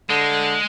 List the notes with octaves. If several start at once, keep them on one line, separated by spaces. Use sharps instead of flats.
D3 G#3